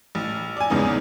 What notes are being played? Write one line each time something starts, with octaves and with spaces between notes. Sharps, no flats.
A1
D5 G#5
E2 G#2 C#3 B3 D#4